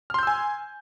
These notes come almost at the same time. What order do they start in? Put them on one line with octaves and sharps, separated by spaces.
F6 C6 G6 E6 G#5